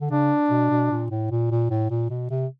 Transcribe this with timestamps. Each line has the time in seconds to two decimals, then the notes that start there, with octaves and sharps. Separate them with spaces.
0.01 D3
0.11 C#3 D4
0.50 B2
0.71 B2
0.91 A#2
1.11 A2
1.31 A#2
1.51 A#2
1.70 A2
1.90 A#2
2.10 B2
2.31 C3